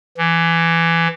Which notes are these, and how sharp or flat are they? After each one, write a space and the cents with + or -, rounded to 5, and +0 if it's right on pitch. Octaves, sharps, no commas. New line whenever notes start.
E3 +20